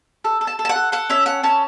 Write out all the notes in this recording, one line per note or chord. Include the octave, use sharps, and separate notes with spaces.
A4
A4
A5
A4
A5
F#5
A4
A4 F#5
C#4 E5
A4 F#5
C#4 A5